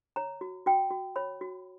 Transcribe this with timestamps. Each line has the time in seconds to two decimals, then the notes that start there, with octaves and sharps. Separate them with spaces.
0.16 C#5 A#5
0.41 F#4
0.66 F#4 G5
0.91 F#4
1.16 C#5 B5
1.41 F#4